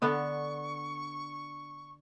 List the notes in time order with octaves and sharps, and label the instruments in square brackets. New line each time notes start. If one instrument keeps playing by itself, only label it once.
[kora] D3 B3 D4 [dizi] C#6